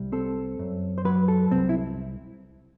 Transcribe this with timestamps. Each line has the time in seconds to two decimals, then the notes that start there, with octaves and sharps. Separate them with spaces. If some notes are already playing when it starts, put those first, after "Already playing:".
Already playing: C2 G3
0.12 C4 A4
0.59 F#2
0.98 C5
1.05 F#3 B4
1.28 A4
1.51 C2 C4
1.69 E4